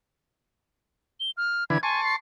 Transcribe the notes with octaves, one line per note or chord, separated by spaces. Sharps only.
G7
F6
D3 E3 B4 G#6
G#5 A5 C6 C#6
C7